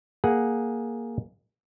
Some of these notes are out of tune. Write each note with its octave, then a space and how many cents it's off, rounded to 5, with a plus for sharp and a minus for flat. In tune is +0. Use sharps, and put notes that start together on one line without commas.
A#3 +0 G#4 +0 F#5 +0